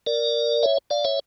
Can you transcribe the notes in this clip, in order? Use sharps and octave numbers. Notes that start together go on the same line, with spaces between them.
A#4 D5
C#5 E5
D5 F5
C#5 E5